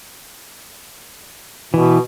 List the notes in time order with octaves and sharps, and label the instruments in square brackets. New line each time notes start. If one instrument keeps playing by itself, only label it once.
[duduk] B2 [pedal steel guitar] E3